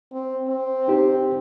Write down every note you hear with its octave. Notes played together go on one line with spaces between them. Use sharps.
C4
C4
D#4 G4 C5